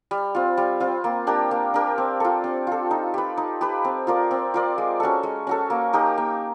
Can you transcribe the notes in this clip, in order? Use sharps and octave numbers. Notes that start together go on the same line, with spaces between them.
G3
C4 F4
G3
C4 F4
A#3
D4 G4 A#4
A#3
D4 G4 A#4
C4
F4 A4
C4
F4 A4
D#4
G4 B4
D#4
G4 B4
C4
F4 A#4 D5
C4
F4 A#4 D5
G#3
C#4 F#4 A4
G#3
C#4 F#4 A4
A#3
D#4 G4 A#4
A#3